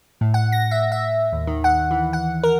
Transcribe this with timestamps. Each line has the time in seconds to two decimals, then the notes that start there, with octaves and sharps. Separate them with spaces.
0.21 A2
0.34 F#5
0.52 A#6
0.71 E5
0.92 E5
1.32 D#2
1.47 D#3
1.64 F#5
1.91 E3
2.13 F#5
2.43 A#4